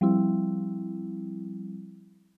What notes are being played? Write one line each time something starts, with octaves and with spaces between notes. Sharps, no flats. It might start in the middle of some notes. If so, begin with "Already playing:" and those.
F3 G3 C4 E4